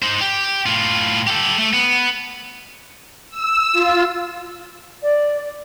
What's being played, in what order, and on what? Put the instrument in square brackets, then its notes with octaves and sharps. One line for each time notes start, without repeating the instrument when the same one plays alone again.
[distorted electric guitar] D#4 C5
G4
A2 F4
G4 A4
A3
B3
[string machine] E6
F4
[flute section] D5